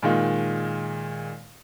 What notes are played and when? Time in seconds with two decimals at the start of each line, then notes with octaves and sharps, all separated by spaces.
0.03 A#2 D#3 G#3 D#4 F4